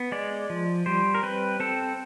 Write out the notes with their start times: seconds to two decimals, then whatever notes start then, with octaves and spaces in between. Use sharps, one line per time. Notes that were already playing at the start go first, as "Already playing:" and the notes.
Already playing: B3
0.12 G#3 D5
0.50 F3
0.86 G3 C5
1.14 A#4
1.23 C4 B4
1.60 C4 A4